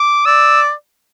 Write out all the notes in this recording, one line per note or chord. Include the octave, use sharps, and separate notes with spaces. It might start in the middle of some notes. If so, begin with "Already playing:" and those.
Already playing: D6
D5 E6